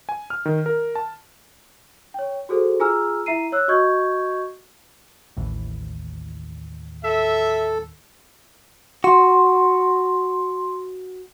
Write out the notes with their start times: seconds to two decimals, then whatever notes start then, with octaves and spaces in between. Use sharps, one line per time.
0.09 G#5
0.30 F6
0.46 D#3
0.66 A#4
0.95 A5
2.14 C#5 G5
2.49 F#4 G#4 A4 C5
2.80 F4 G#4 G#5 A#5 E6 F6
3.26 E4 E5 A#5 C7 D#7
3.52 C#5 E6 F#6
3.68 F#4 D#5 C#6 G6 G#6
5.37 A1 D#2 A2 E3
7.04 A4 E5
9.04 F#4 C6